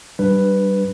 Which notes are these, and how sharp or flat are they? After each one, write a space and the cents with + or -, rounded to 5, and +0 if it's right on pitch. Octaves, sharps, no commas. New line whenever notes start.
G3 -25 D4 +0 B4 +0